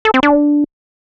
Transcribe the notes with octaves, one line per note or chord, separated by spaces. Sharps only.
A4
C4
D4